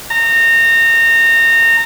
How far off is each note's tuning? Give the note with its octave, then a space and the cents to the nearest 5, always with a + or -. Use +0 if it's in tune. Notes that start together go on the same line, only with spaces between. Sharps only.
A#5 -25